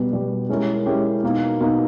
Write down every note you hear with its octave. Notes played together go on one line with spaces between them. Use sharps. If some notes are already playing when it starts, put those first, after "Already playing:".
Already playing: B2 G3 B3 G4
B2 G3 B3 G4
G#3 C#4 E4 G4 A#4
G#3 C#4 E4 G4 A#4
B2 A#3 D#4
B2 A#3 D#4